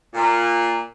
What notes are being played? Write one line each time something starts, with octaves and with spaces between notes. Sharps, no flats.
A#2